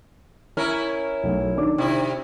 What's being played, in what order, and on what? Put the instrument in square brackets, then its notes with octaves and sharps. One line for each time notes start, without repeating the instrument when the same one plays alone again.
[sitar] C#4 E4 A#4
[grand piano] B1 A3
D#3 D4 D6
[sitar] C3 E4